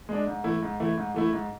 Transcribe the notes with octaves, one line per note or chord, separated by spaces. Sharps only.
G#3 D4
G#2
E3 A3 E4
G#2
E3 A3 E4
G#2
E3 A3 E4
G#2